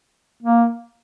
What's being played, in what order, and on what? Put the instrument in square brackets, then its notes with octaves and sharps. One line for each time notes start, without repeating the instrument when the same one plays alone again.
[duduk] A#3